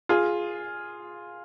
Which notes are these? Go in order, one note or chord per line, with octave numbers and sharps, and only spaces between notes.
F4 G#4